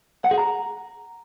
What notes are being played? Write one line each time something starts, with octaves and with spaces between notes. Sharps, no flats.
F#5
G#4
A#5